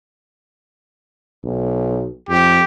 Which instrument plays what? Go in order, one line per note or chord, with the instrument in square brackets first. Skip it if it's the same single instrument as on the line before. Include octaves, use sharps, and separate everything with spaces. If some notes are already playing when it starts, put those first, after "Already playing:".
[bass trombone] B1
[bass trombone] F2 [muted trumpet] G4